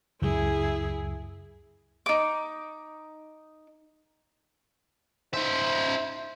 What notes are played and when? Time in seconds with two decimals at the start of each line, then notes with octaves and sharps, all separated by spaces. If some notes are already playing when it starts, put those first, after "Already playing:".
0.22 C#2 F#2 E4 G#4
2.06 D#4 D6
5.34 D#4 C5 E5